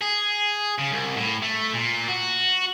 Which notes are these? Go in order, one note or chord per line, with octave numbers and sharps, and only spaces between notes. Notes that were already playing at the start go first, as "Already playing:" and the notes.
G#4
C#3
C2
A2
A3
A#2
F#4